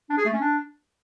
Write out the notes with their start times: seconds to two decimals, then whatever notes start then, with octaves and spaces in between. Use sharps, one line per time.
0.10 D4
0.18 G#4
0.25 A3
0.33 C#4
0.41 D4